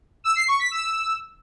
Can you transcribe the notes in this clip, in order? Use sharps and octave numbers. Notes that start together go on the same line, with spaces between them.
E6
C7
C#6
B6
E6